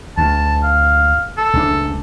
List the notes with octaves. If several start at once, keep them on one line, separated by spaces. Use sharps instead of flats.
D2 A5
F5
A4
C#2 C#3 D4